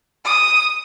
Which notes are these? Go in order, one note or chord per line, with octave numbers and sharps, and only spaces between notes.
D#6